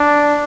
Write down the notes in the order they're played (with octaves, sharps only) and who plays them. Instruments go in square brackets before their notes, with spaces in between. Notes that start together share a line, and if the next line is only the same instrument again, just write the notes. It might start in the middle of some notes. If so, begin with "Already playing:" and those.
Already playing: [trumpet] D4